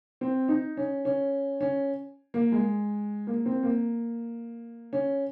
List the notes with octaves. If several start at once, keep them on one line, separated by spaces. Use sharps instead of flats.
C4
D#4
C#4
C#4
C#4
A#3
G#3
A#3
C4
A#3
C#4